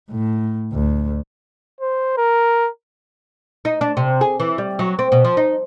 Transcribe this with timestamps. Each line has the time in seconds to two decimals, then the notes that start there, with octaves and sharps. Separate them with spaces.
0.11 A2
0.73 D2
1.81 C5
2.18 A#4
3.65 D#4
3.81 D4
3.97 C3
4.21 G#4
4.40 E3
4.58 G3
4.79 F#3
4.99 C4
5.12 B2
5.25 F3
5.37 D#4